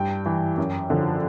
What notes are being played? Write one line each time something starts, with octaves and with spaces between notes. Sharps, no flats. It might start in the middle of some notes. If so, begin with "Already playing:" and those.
Already playing: G2 G5
E3
F#2
D3 F3